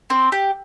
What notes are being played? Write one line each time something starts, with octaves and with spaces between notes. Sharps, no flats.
C4
G4